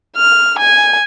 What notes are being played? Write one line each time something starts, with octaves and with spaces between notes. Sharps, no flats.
F6
G#5